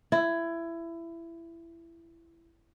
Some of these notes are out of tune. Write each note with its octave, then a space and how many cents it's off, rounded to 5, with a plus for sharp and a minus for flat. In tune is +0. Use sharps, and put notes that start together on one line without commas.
E4 +20